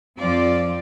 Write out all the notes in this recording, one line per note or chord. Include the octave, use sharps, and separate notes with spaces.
F2 F3 C4 F4 D5